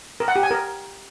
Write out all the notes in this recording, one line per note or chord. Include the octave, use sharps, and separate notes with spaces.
A#4
F#5
G4
G#5
A#4